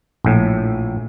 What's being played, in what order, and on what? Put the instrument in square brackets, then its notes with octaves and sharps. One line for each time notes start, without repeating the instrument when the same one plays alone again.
[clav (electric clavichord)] A#1 A2